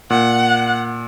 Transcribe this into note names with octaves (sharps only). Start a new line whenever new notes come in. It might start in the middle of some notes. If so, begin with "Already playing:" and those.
A#2 F#5